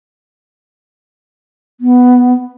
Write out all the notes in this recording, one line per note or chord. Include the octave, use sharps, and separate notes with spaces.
B3